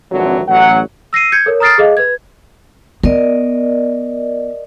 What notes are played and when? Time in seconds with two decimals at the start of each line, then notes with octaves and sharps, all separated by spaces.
0.11 G#1 F2 D3 E3 F#3
0.48 A1 F#3 F#5
1.13 E6 A#6 C7 D#7
1.32 G6 G#6 C#7
1.46 A4 A#4 C#5
1.60 A#5 D#6 F6 A6 C7 D7
1.78 G#4 A4 D#5 F5
1.97 B4 G#6
3.04 B3 A#4 D5 D#5